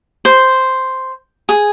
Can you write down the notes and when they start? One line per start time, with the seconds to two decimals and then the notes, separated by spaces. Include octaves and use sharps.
0.25 C5
1.49 G#4